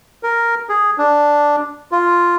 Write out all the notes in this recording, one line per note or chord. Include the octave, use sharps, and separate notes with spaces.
A#4
G#4
D4
F4